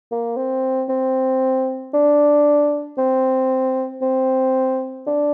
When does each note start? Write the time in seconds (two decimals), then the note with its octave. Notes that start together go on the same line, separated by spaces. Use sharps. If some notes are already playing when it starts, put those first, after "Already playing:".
0.11 A#3
0.37 C4
0.89 C4
1.94 D4
2.98 C4
4.02 C4
5.07 D4